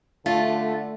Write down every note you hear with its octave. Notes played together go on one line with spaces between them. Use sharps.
D3 A3 F4 E5